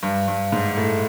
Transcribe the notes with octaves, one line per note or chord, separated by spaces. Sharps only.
G2
G2
G#2
A2